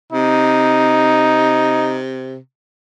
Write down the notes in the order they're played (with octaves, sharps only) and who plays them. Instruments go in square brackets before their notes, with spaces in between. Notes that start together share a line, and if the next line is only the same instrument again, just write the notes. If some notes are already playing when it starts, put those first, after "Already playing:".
[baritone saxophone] C3 [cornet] D#4